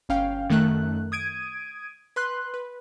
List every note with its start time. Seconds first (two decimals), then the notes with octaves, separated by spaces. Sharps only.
0.09 G1 C#4 F5 G5
0.49 F#2 D#3 A3 F#6
1.12 D#6 G#6 D7 D#7
2.16 B4 C6 F#6
2.54 B4